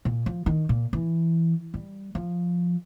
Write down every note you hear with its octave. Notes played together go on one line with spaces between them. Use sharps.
A#2
F3
D#3
A#2
E3
G3
F3